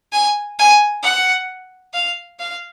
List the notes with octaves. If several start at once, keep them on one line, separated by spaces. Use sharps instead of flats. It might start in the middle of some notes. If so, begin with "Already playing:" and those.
G#5
G#5
F#5
F5
F5